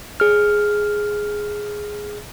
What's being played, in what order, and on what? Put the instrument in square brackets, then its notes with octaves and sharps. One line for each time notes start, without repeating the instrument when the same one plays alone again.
[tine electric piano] G#4 F6